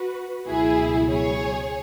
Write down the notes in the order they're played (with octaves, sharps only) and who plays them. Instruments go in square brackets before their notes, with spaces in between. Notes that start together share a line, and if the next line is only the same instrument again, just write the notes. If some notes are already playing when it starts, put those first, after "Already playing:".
Already playing: [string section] F#4 B4
C#2 B2 F#3 E4 G#4
G#4 C#5